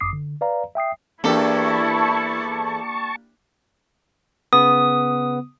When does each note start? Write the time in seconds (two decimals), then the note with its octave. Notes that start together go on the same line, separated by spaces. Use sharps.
0.01 G1 F#2 D6 D#6 C7
0.13 D3
0.41 B4 D5 F5 A#5
0.75 E5 G5 D#6 C7
1.24 E2 A#3 D4 E4 G4 A4 A5 C#6
4.53 C#3 B3 D#6